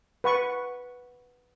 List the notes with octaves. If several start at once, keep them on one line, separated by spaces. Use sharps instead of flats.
B4 F#5 C#6